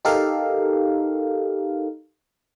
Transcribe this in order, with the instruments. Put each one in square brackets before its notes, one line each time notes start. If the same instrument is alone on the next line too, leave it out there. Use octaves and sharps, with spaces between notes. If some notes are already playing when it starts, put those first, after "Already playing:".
[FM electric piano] D#4 G4 A4 A#4 F5